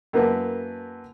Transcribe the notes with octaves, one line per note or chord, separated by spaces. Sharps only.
F#2 A#3 B3 E4 A5